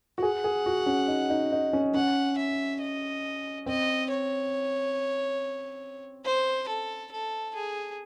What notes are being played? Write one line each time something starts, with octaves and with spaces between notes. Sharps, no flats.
F#4
G#4 F#5
G#4
F#4
C#4
D#4
D#4
D#4
C#4
C#4 F#5
E5
D#5
C4 D#5
C#5
C5
A4
A4
G#4